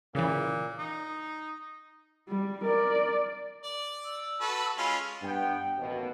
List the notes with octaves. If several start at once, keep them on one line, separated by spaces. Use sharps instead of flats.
A#2 C#3 E3
D#4
G3
A#4 D5
D5
E6
F#4 A4 B4
G#3 C#4 F4 B5
G2 B3 G5
A1 D#2 B2